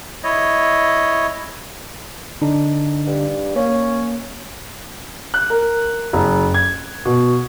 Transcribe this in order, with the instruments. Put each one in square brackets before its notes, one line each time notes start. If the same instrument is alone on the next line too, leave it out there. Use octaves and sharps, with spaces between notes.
[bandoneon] E4 C#5 D#5
[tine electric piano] D3 D4 D#4
[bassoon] G2
[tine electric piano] A#3 [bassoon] C#4
[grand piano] F#6
A#4
F#1
G#6
B2